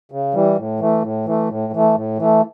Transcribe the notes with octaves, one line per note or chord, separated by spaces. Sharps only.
C#3
E3 G3
A2
E3 A3
A2
E3 A3
A2
E3 A3
A2
E3 A3